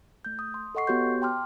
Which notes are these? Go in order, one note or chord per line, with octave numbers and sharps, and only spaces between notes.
A3 G6
D#6
C6
A4 D#5 F#5 C#6 C7
B3 F#4 G4 C#5 C6 G6
G5 A5 C6 D6 F6